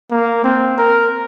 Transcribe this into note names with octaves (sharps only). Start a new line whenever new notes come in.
A#3
C4
A#4